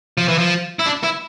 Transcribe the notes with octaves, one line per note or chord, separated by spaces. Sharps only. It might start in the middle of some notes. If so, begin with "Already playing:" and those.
F3
E3
F3
E4
D4
E4